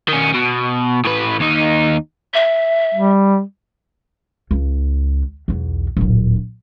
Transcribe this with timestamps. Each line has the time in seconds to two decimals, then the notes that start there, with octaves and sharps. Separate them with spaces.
0.08 D#3 C#4
0.34 B2
1.05 A2 B4
1.40 D#2 D#4
2.34 E5
2.95 G3
4.51 C#2
5.48 B1 E2
5.97 D1 A#1